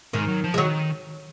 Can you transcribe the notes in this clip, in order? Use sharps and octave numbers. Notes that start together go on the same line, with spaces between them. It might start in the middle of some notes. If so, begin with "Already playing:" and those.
G#2 D#3
F#3
F3
G#3
D#3 F#3